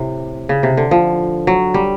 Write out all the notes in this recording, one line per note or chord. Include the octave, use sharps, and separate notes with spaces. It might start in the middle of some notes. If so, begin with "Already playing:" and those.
Already playing: A2 C3
C#3
C3
D3
F3
F#3
G3